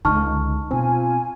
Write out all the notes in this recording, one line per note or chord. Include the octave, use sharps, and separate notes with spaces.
C#2 D3 D#4 A5 C#6 F6
B2 C4 F4 G#5